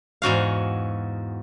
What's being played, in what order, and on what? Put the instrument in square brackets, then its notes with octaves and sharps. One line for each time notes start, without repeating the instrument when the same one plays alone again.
[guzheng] E2 G#2 F#4 F5